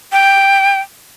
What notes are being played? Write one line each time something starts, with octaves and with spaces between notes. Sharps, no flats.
G5